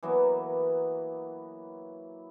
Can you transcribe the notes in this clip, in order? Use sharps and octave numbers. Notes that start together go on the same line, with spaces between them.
E3 F#3 A#3 B3